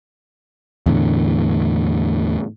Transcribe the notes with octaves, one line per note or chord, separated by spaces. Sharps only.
E2 A2 D3